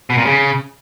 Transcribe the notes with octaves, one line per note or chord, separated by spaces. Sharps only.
B2
A#2
C#3